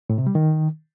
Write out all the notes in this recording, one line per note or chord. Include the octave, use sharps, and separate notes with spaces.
A2
C3
G3
D#3